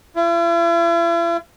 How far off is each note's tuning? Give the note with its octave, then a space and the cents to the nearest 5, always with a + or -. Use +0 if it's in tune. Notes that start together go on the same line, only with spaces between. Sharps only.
E4 +45